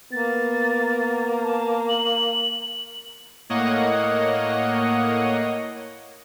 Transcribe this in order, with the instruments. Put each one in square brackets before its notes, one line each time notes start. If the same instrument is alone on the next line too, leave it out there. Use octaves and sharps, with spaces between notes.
[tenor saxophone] A#3 [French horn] B3 [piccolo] A6
[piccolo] A5
F#7
[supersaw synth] A2 A#3 C#5 D#5 F#5